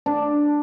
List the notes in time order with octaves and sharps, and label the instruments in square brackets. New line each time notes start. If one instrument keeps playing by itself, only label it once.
[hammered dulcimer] D4